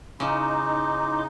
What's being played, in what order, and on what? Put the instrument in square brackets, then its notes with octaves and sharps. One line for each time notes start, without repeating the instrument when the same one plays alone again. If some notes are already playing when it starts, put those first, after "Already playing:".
[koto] C#3 [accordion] D#4 [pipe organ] E4 C6 D6